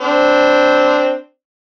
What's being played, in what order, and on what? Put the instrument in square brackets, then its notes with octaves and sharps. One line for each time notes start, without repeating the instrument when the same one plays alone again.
[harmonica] C4 D4